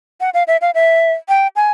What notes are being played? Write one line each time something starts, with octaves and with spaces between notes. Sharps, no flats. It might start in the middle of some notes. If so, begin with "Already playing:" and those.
F#5
F5
E5
F5
E5
G5
G#5